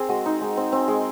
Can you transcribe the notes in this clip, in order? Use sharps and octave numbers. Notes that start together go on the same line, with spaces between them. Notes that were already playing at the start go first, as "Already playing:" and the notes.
Already playing: C4 G#4 A#4
G#3 F#4
D#4
G#3
C4
C4
G#3